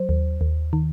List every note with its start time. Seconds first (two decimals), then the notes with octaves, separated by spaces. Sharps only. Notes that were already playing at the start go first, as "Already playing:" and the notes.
Already playing: F#3 C5
0.09 D#2
0.41 D#2
0.73 D#3